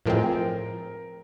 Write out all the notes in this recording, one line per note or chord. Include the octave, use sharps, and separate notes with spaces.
A2 F3 G#3 C4 A#4